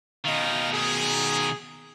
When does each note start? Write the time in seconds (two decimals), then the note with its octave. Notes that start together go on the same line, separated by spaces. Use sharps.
0.25 B2 D#3 D#5 F5
0.72 G#4